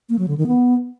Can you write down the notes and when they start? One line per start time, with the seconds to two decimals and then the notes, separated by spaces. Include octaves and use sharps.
0.09 A#3
0.19 F#3
0.28 D3
0.38 D#3
0.47 B3